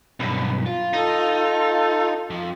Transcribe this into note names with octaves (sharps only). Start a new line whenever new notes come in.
B1 G2 C4 B4
F4
D#4 A4
F2 F3